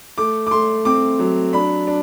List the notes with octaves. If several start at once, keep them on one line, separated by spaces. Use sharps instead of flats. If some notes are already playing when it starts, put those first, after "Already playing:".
A3 D6
D6
A3 C6
C4 D6
F#3
D4 B5
D4